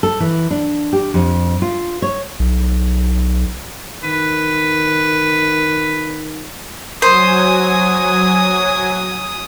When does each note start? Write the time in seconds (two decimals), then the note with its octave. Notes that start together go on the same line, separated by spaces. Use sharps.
0.03 A4
0.20 E3
0.51 D4
0.93 G4
1.14 F2
1.62 F4
2.02 C#5
2.40 B1
4.03 D#3 B4
7.02 F#3 C5 G#5 D#6